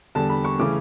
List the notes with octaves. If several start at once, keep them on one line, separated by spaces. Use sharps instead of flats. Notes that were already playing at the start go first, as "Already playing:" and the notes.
E2 D3 G3 A5
B5
C#6
C#3 E3 A3 C#4 D6